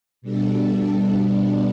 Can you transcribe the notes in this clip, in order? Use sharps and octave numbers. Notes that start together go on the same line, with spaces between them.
B2 G3 D4 A4
B2 G3 B3 D4